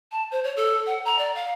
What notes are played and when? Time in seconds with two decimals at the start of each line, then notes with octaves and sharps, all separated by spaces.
0.12 A5
0.31 C5
0.44 C#5
0.57 A4
0.86 F#5
1.05 A#5
1.19 D5
1.35 F5